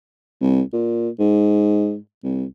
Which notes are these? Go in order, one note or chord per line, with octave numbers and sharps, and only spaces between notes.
C2
A#2
G#2
C2